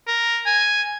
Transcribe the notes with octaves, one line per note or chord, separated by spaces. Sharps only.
A#4
G#5